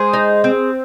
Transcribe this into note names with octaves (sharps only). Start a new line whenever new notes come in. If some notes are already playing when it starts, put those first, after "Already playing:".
Already playing: G#3 G#4 C5
D#4
C4